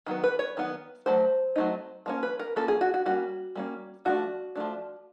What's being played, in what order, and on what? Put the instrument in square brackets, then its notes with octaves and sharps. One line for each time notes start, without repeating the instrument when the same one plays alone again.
[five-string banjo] D#3 F#3 B3
B4
C#5
D#3 F#3 B3
F#3 A3 C5
F#3 A3 C4 D#4
F3 A#3 C#4
B4
A#4
F3 A#3 C#4 A4
G#4
F#4
F#4
G3 A#3 C#4 F#4
G3 A#3 C#4
F3 A3 D4 F#4
F3 A3 D4